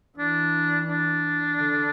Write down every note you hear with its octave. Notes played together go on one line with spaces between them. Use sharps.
E3 D4
D4
D3